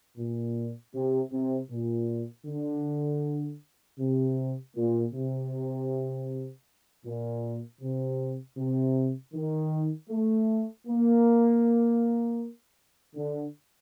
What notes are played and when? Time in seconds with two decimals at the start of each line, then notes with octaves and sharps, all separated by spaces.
0.17 A#2
0.94 C3
1.31 C3
1.70 A#2
2.46 D3
3.99 C3
4.76 A#2
5.14 C3
7.04 A#2
7.81 C3
8.58 C3
9.34 D#3
10.10 A3
10.87 A#3
13.16 D3